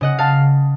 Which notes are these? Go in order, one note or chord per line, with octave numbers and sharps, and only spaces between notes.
C#3 D#5 F#5
F5 A5